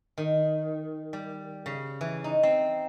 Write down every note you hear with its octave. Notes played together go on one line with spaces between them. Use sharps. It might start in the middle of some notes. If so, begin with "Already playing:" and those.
D#3
G3
C#3
E3
D#4
C4